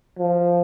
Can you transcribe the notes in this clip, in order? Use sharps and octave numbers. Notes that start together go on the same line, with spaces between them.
F3